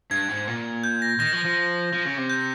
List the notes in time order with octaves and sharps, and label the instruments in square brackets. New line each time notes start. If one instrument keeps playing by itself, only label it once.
[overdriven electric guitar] G2 [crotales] G#6
[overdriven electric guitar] G#2
A#2
[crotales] G6
A#6
[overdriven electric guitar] D#3 [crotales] A#6
[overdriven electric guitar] F3
F3
F3
C#3
C3
[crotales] G6